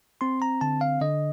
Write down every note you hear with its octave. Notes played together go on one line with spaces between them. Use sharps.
C4 C6
A#5
D3 A5
F5
D3 D#5